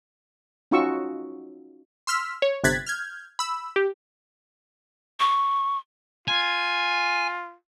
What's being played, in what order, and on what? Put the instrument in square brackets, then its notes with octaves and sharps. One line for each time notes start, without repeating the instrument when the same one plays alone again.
[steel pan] C#4 D#4 F4 F#4 C#6 E6
[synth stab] C6 E6 F6 B6
C#5
G1 C3 F#6 G#6 A6 B6
F6 G6 G#6
B5 E6
G4
[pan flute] C#6
[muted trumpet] F4 [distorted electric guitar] G#5